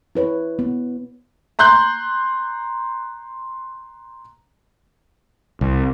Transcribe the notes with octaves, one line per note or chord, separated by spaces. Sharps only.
E4 B4 C#5
B3
A#5 C6 F#6 G6
C2